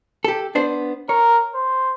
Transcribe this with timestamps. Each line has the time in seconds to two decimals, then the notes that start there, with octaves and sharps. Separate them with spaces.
0.25 G4 A4
0.55 B3 D4 C5
1.09 A#4 C#5
1.55 C5